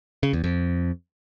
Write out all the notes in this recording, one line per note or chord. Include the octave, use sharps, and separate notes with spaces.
C#3
E2
F2